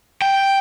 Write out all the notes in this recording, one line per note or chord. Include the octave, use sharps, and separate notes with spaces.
G5